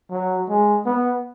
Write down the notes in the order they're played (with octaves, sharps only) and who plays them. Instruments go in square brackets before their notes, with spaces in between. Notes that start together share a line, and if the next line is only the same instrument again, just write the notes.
[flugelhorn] F#3
G#3
B3